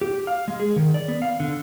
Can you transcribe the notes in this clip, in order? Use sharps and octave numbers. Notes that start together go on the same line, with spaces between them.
G4
F5
G#3
G#4
D#3
D5
B3
F5
D3